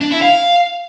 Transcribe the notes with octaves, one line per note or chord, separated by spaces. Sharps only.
D4
E4
F5